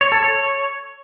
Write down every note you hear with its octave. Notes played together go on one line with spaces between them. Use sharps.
C#5
A4
C#5